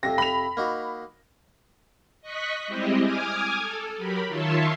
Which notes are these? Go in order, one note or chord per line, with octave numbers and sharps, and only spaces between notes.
F2 C3 A#6
B5 F7
A#3 D#4 F#4
D#5 C#6 F#6 B6
G3 G#3 C4 E4 G4 D#5
G#5 D6 D#6 F6 G#6
A4
F#3 G4 A#4 B5
D#3 F4 C#5 E5 A5 C6